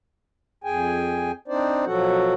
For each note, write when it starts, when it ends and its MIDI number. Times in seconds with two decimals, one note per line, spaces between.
0.64 1.31 41
0.64 1.31 68
0.64 1.31 79
0.64 1.31 80
1.48 1.85 60
1.48 1.85 62
1.48 1.85 63
1.48 1.85 72
1.48 1.85 74
1.85 2.34 47
1.85 2.34 53
1.85 2.34 54
1.85 2.34 66
1.85 2.34 69
1.85 2.34 78